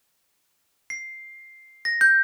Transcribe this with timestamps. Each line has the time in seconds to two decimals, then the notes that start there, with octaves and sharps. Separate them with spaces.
0.90 C7
1.85 A#6
2.01 G6